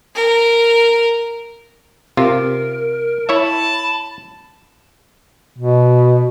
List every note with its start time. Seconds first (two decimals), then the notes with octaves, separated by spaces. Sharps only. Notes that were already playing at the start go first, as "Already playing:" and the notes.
0.15 A#4
2.17 C3 F4 A#4
3.29 E4 C#5 E5 A5 B5
5.58 B2